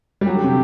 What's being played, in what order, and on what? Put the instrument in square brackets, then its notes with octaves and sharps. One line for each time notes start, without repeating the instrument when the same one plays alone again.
[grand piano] G3
[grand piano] F#3 [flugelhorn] G4
[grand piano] D3
C3